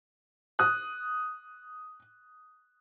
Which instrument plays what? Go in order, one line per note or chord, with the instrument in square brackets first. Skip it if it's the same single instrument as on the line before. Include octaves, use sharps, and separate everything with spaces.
[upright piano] D#6 F#6